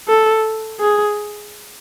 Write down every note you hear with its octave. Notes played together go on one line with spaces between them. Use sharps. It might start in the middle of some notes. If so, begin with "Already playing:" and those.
A4
G#4